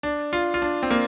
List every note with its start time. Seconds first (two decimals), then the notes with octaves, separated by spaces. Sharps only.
0.03 D4
0.33 F4
0.54 F4
0.62 D4
0.83 C4
0.91 A#3